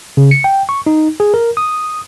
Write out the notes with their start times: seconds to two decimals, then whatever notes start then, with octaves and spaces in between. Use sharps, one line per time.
0.17 C#3
0.31 C#7
0.44 G5
0.69 C#6
0.86 D#4
1.20 G#4
1.34 A#4
1.57 D#6